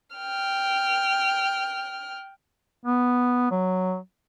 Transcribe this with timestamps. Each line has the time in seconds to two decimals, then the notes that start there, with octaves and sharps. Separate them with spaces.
0.16 G5 F6
2.85 B3
3.51 F#3